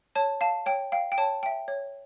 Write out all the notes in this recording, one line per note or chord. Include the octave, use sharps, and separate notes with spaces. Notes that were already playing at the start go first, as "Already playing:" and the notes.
C#5 A5
F5 A5
C#5 G5
F5 G5
G5
C#5 A5
E5 G5
C#5